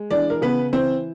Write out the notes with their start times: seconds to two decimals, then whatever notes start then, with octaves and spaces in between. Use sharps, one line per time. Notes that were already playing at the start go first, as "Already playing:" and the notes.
Already playing: G#3
0.10 E3 D4 D5
0.30 A#4
0.41 C#3 B3 B4
0.73 E3 C4 C5